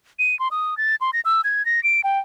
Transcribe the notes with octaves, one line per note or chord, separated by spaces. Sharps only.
D#7
C6
D#6
A6
C6
A#6
E6
G#6
A#6
D7
G5